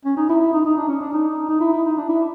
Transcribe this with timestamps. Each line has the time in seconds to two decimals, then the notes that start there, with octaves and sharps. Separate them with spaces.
0.05 C#4
0.17 D#4
0.29 E4
0.41 E4
0.53 D#4
0.65 D#4
0.77 D4
0.88 C#4
1.01 D4
1.13 D#4
1.49 D#4
1.60 E4
1.73 E4
1.85 D#4
1.97 D4
2.09 E4